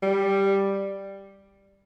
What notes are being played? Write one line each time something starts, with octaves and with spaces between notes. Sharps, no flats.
G3